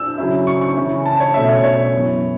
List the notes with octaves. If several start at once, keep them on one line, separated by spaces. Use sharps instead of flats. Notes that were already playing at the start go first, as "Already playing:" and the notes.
Already playing: E6
C#3 F#3 C#4 E4
C#6
C#6
C#3 E3 C#4 E4
A5
C#5
B2 A3 C#4 E5
C#5
C#5
F#2 E3 B3